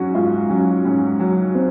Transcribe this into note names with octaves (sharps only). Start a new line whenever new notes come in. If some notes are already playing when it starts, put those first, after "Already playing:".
Already playing: G#2 F#3 C#4 F#4
G#2 F4
F#3 C#4
G#2 C#4
F#3
C4